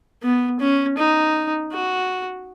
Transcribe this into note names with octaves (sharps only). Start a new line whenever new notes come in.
B3
C#4
D#4
F#4